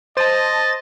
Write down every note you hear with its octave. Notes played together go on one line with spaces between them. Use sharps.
C5 D#5 A5 A6